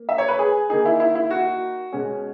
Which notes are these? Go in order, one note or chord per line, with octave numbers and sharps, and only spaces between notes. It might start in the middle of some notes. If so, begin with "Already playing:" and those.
Already playing: A#3
E5
C#5
B4
G#4
D#3 A#3 D#4 G#4
E4
E4
E4
F#4
B2 G#3 C#4